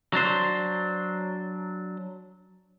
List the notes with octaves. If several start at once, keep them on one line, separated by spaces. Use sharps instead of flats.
F#3 D4 C5